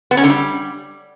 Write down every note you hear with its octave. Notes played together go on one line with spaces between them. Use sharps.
B3
C#4
D3
G3